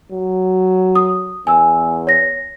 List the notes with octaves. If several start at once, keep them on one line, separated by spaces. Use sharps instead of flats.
F#3
D#6
E2 G#5 E6
C#5 A#6